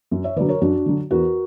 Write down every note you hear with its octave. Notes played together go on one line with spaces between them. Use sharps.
F#2
C#5 E5
D3 F#3 B4 D5
A#4 C#5
F#2 D4 F#4
D3 F#3
E2 F#4 A#4